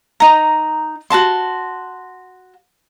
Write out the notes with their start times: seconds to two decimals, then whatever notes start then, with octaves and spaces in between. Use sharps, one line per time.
0.20 D#4 A#5
1.10 F#4 A#4 A5 C6